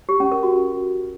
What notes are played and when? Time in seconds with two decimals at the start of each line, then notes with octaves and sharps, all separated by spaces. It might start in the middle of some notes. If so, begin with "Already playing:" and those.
0.09 G4
0.20 C#4
0.32 A#4
0.43 F#4